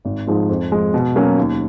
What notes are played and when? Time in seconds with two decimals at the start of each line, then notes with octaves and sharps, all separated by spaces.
0.05 G#1
0.27 G#2 F3 G#3
0.49 F2
0.72 F3 G#3
0.94 B2
1.16 F#3 A#3 C#4
1.38 D#2